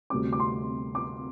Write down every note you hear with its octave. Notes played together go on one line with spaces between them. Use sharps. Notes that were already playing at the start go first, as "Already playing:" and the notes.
D2 C3 G3 C4 D6
D6
C6
D6